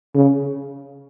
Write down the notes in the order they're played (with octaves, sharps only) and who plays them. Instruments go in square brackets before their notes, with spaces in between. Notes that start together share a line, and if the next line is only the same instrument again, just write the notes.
[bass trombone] C#3